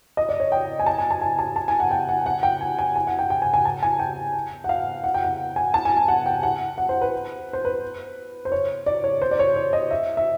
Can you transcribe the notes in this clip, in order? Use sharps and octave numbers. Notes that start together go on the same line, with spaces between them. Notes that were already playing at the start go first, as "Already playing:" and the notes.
D#5
D5
C#5
G5
G#5
A5
G#5
A5
G#5
A5
A5
G#5
F#5
G5
F#5
F#5
G5
G#5
G#5
G#5
F#5
G5
G5
G#5
G#5
A5
G#5
G5
F#5
F5
F#5
G5
F#5
G#5
A5
G#5
G#5
F#5
G5
F#5
F#5
C5
B4
C5
B4
C5
C#5
D5
C#5
C5
D5
C#5
C#5
D#5
E5
E5